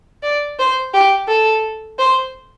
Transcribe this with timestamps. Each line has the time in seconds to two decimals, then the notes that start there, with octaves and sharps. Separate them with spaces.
0.23 D5
0.59 C5
0.93 G4
1.28 A4
1.99 C5